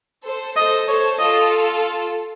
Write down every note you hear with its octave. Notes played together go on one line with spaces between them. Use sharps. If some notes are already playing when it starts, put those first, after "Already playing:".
A4 C5
A4 C5 D#5
A4 C5 C#5
F4 A4 D#5